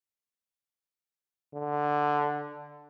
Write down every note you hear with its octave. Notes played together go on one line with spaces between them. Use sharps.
D3